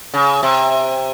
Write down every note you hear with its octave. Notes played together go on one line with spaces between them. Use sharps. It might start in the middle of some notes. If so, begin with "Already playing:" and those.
C#3
C3